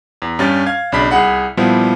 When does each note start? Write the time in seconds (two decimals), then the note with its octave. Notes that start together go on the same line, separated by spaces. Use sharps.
0.22 E2
0.39 G2 C#4 G4 A6
0.66 F5 G#6
0.92 B1 C#3 D4 B5 B6
1.11 C2 G#4 F#5 B5
1.57 A#2 F3 G3 B3 E4